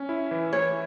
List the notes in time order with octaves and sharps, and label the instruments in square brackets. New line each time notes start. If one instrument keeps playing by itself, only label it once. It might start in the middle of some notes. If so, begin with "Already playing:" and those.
Already playing: [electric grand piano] C#4
E4
E3
[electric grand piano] E3 [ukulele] C#5